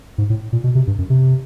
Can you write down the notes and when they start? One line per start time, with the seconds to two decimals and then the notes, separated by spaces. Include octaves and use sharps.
0.18 G#2
0.30 A2
0.53 A#2
0.64 B2
0.75 C3
0.87 G2
0.98 F#2
1.10 C3